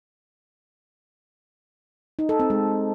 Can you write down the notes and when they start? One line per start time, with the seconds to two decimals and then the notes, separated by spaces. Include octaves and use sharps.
2.19 D#4
2.29 A4
2.40 C4
2.50 G#3